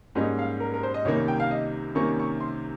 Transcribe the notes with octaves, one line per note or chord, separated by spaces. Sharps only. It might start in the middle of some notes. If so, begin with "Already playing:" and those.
G#2 G3 A#3 C#4 D#5
F5
A#4
A#4
C5
D#5
C2 C3 D#3 A#3 C#4 C#5
G5
F5
D#5
C2 C3 D#3 A#3 C#4 C#6
C#6
C6